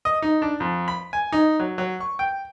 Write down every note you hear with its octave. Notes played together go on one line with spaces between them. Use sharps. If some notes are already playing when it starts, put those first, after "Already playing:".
D#5
D#4
D4
F2
B5
G#5
D#4
F#3
F#3
C#6
G5